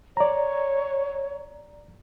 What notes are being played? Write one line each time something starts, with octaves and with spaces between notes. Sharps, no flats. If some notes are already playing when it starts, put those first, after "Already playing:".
C#5 D5 A#5